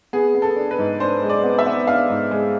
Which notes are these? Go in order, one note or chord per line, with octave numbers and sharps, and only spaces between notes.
B3 G#4
B3
A4
D4
B4
G#2
D4 C5
G#3
D5
B3
E5
B3
D4 F5
G#2
G#3